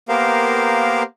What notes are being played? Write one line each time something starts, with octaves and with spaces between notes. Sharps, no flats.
A#3 B3 G4 A#4 C5 F5